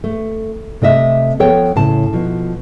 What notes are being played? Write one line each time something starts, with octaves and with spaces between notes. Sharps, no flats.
A3
C3 A3 D#5 E5
F3 B3 A4 C#5 G5
A2 C#3 A5
B2 F3